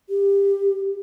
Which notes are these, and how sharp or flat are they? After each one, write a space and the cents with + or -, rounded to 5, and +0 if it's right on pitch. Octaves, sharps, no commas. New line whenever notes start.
G4 +20